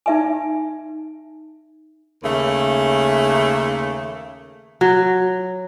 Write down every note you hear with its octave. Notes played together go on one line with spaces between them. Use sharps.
D#4 E5 G#5
D#2 C#3 A3
F#3